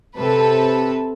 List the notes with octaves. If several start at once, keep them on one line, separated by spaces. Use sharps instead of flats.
C3 A4 B4